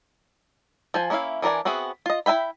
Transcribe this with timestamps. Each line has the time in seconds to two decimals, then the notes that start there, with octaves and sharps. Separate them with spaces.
0.94 F3 C5 G#5
1.10 A#3 C#4 E4 E5 F5
1.42 E3 D4 A#4 D5 G#5
1.65 B3 C4 F#4 G#4 E5
2.06 F4 D#5
2.26 E4 B4 E5 G5 B5